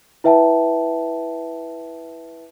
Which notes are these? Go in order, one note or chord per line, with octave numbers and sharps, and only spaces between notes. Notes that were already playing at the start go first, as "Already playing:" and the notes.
E4 B4 E5 G5 A5